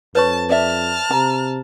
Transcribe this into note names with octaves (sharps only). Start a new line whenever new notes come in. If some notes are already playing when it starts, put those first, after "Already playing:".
F2 B4 C#5 A5 C#6
D5 E5 A5 F6
C3 A#5